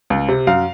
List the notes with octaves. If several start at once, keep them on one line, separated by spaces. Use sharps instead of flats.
C#2
C3
F#2 F5